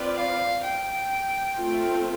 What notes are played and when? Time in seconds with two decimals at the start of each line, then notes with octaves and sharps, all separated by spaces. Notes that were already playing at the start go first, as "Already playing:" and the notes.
Already playing: C4 F4 B4 D5
0.16 F5
0.63 G5
1.57 A3 C4 F4